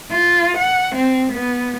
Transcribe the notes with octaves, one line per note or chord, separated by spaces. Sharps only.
F4
F#5
C4
B3